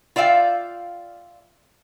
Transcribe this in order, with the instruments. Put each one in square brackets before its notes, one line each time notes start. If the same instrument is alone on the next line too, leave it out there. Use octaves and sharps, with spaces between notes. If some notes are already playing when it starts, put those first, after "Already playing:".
[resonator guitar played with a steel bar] F4 D5 E5 F5 G5